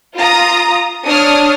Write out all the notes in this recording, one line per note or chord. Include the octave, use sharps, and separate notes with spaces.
F4 A#5 D#6
D4 C#5 D#6 F6